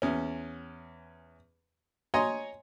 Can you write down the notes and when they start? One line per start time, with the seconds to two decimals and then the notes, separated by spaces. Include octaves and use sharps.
0.02 E2 C#4
2.14 C#5 D#5 G#5 A#5 C6